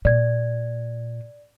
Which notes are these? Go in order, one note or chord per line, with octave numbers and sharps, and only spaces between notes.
A#2 D5 G#6